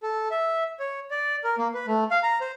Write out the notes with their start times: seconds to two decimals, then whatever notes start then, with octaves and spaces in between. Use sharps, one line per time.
0.03 A4
0.31 E5
0.80 C#5
1.11 D5
1.44 A#4
1.58 A#3
1.74 B4
1.87 A3
2.11 F5
2.23 A#5
2.41 C5